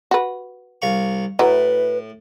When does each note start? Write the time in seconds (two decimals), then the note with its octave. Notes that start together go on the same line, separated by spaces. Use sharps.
0.11 F#4 B4
0.82 C2 F5 C#6
1.39 A2 F#3 E4 B4